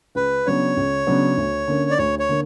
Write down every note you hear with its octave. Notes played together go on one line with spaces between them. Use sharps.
C#2 B4
C#3 F#3 B3 D4 C#5
C#2
C#3 F#3 B3 D4
D2
D3 A#3 C#4
D5
D2 C#5
C#5
D3 A#3